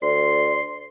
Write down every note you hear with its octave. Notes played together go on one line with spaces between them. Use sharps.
D2 D5 C6